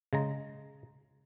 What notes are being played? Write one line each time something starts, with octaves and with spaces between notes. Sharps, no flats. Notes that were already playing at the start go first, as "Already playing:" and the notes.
C#3 G#3 A#5